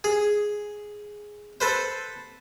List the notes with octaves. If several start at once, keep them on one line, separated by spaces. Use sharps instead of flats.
G#4
A4 B4 C5